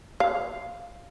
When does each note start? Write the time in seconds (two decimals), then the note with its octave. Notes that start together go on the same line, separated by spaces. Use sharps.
0.20 F5